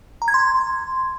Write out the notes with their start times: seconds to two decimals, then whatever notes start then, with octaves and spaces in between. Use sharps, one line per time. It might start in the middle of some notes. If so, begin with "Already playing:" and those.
0.22 A#5
0.28 G#6
0.34 C6